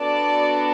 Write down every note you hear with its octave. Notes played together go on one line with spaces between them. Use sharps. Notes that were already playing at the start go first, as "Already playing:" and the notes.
Already playing: B3 D4 F#4 A4 D5